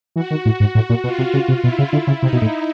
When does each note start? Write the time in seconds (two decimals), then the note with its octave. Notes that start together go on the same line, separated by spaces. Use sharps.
0.16 E3 F#4
0.31 D#3
0.45 A2 F#4
0.60 G#2
0.75 A2
0.90 A#2
1.04 B2 F4
1.19 C3
1.34 C#3
1.48 C3
1.63 B2 E4
1.79 C#3
1.93 D3
2.07 C#3
2.22 C3 D#4
2.33 B2
2.42 A2